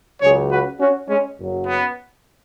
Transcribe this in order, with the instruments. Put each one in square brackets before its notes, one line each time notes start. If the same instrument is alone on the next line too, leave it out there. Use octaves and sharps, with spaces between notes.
[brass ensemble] C#2 C#3 F#3 G#4 C#5
F#4 B4
C#4 F#4
G#3 C#4
F#1 F#2 F#3
B3